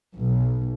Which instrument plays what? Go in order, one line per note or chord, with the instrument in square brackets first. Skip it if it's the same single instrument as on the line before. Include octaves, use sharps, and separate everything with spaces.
[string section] B1